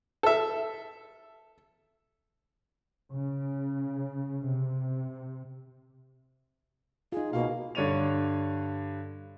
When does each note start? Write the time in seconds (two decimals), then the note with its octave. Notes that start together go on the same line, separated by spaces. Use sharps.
0.23 A4 E5
3.15 C#3
4.48 C3
7.12 D#4 F4 G#4
7.33 B2 A#3 F5
7.75 G2 D3 C#5 D5 D#7 F7